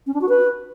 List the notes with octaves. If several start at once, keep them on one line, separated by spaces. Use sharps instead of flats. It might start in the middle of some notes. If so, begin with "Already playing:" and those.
C#4
D4
F#4
B4